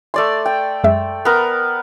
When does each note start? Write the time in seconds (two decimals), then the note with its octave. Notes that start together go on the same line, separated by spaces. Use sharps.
0.14 A3 D5 C6
0.46 G5
0.84 F#2 G#3 E5
1.25 B3 A#4